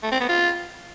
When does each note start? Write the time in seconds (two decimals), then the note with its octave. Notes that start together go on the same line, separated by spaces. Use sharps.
0.03 A3
0.12 C4
0.20 B3
0.29 F4